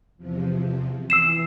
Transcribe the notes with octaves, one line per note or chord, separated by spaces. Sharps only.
E2 C3 F3
E3 E6 C7 E7